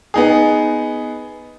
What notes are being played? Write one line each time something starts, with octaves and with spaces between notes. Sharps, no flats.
B3 D#4 G#4